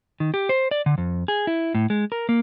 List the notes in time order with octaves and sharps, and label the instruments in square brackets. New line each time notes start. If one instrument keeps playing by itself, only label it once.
[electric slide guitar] D#3
G4
C5
D5
D3
F2
G#4
E4
A2
G#3
A#4
A#3